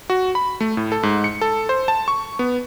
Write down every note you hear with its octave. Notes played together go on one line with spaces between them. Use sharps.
F#4
B5
A3
A2
A4
G#2
C#7
A4
C5
A5
C#6
B3